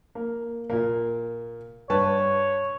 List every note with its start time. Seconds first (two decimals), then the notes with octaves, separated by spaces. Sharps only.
0.15 A#3
0.70 A#2 A#3
1.90 G2 B4 C#5 A5